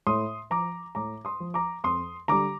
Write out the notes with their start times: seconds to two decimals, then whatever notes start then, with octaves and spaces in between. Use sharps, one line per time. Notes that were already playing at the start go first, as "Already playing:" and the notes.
0.07 A2 C6 D#6
0.50 F3 A#5 D6
0.95 A2 A#5 D6
1.25 C6 D#6
1.40 F3
1.54 A#5 D6
1.84 F2 C6 D#6
2.28 D3 G3 A#5 D6